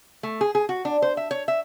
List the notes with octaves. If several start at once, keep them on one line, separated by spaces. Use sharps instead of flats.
A3
G#4
G#4
F#4
D4
C5
E5
C#5
E5